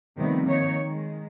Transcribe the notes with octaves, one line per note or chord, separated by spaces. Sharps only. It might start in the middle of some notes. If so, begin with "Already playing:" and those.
C3 D#3 F3 G3 A3 B3
D#3 A#3 D#4 C#5
D#3 G#3